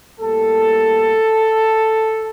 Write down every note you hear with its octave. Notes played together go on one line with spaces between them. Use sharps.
A2 G3 A#3 A4